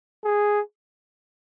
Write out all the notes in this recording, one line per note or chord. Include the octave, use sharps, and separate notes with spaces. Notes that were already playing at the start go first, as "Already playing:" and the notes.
G#4